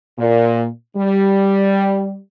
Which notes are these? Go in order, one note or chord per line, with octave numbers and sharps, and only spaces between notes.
A#2
G3